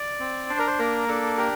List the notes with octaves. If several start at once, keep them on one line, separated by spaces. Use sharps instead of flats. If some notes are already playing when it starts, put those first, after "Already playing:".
Already playing: D5
C4
D4 C5
A#4
C5
A#3 A#4
D4 A4
G4 A#4